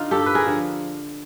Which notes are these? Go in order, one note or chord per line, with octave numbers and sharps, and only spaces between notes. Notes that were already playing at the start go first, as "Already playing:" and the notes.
Already playing: D3 D#4 F4
G2 G4 A4
B4
G#4 A#4
D3 F3